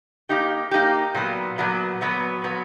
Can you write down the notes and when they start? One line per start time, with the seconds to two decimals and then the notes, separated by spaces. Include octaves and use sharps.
0.29 A#3 D#4 G4
0.71 A#3 D#4 G4
1.15 A#2 F#3 B3
1.58 A#2 F#3 B3
2.01 A#2 F#3 B3
2.44 A#2 F#3 B3